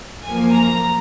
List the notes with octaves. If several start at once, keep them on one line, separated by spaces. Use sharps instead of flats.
F#2 F3 A#3 G#5
A#5